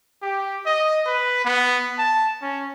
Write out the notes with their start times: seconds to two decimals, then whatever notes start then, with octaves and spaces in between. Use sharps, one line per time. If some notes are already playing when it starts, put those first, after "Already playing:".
0.22 G4
0.66 D#5
1.06 B4
1.45 B3
1.98 A5
2.42 C#4